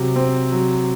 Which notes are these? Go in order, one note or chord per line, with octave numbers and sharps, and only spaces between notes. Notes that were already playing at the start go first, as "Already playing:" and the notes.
Already playing: C3 F#3
C4
F#3